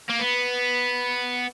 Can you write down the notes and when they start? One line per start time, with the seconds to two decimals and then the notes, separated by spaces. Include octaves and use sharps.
0.09 A#3
0.19 B3